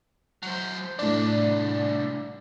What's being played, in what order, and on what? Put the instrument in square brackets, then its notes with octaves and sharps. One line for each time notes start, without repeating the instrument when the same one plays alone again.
[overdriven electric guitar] F#3 C5
[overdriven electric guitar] C2 D4 [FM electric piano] A2 D5